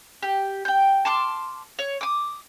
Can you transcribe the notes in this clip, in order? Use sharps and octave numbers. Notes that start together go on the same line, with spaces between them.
G4
G5 G6
A5 C6 D6 F6
C#5
D6 D#6